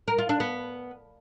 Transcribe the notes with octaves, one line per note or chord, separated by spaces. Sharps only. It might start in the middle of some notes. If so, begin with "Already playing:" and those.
A#4
F4
D4
B3